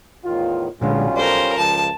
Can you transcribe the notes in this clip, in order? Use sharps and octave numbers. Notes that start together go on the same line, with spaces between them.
E2 A2 D#3 F4
B1 A#2 D3 G3 G#3 C#4 F4
A4 A#4 C5 D5
C#2 F3 A5